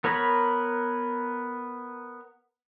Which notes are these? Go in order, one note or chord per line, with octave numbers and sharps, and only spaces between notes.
B3 A#4 C#5 A#5 B5